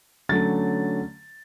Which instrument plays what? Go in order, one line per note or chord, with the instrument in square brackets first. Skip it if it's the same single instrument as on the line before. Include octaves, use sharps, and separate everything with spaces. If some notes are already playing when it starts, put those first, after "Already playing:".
[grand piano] D3 F#3 A3 C#4 A6